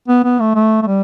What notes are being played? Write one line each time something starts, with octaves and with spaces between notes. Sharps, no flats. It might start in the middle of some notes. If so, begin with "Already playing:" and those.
B3
B3
A3
A3
A3
G3